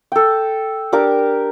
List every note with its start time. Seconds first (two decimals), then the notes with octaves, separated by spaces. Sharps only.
0.12 A4 G5
0.92 D4 G4 A#4 D6